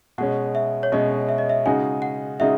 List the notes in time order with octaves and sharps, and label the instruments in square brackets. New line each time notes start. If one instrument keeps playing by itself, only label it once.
[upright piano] B2 G#3 C#4 [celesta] F#5
[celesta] E5
C#5
[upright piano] B2 G#3 C#4 [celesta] D#5
[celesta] E5
D#5
E5
[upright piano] C#3 G#3 D#4 F#4 [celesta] G#5
[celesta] F#5
[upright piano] C#3 G#3 D#4 F#4 [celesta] E5